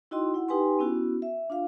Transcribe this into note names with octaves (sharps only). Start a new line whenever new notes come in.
D#4 E4 F#4 D#5 G5 C6
E4 F#5
D#4 G4 B4 G5 G#5 C6
B3 C#4 E4 F#4
E5
D4 F4 F5